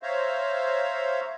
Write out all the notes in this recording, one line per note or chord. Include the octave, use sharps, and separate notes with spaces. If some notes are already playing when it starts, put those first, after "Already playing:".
C5 C#5 E5 F5 A#5